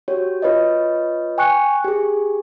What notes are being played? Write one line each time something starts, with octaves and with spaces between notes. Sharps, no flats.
F#4 G4 C#5
F4 B4 C#5 D#5
G5 G#5 C#6 F#6 C#7
G4 G#4